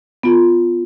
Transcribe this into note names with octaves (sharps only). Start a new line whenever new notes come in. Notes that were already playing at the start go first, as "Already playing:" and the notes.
B3 F4